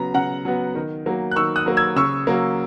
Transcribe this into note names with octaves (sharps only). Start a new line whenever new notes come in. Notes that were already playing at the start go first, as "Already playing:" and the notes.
Already playing: C#3 F#3 B3 A#5
C#3 F#5 A#5
F#3 B3
D#3
F#3 A#3
F#6
D#3 C#6 E6
D#6 F#6
F#3 A#3
E6 G#6
C#3 C#6 E6
F#3 A#3